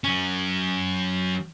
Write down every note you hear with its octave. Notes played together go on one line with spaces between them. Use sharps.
F#3 C#4